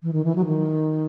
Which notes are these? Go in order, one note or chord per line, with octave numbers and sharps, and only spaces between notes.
E3
D#3
E3
F#3
D#3